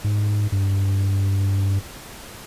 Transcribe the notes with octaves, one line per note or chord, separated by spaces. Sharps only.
G#2
G2